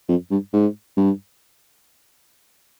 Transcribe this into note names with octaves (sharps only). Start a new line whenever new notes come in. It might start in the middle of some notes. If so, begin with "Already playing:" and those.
F2
G2
G#2
G2